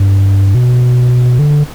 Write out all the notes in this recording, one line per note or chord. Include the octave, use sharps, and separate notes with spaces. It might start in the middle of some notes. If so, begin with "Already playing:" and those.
Already playing: G2
B2
D3